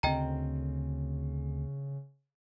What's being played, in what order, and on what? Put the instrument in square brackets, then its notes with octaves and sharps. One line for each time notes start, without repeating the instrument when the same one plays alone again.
[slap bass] D2 C4 [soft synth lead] C#3 [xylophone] D#5 G5 A#5